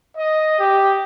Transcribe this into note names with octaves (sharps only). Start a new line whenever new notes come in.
D#5
G4